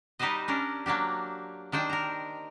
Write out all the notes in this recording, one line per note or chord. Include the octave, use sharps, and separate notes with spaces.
G3 D#4 G4 B4 C5 D#5
C#4 D4 A#4
F#3 A#3 D4 G4
D#3 D4 C5 G5
A#4 A#5